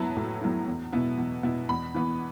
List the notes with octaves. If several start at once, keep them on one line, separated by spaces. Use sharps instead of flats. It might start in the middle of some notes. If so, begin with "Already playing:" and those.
Already playing: F#3 B3 E4 A5
A2
F#3 B3 E4
E2
B2 B3 E4
E2
B2 B3 E4
E2 B5
E3 B3